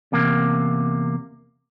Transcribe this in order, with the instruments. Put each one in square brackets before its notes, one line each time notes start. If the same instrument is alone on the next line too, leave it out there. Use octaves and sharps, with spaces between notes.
[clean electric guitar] E2 C3 A#3